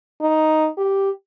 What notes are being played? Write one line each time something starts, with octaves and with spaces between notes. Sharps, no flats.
D#4
G4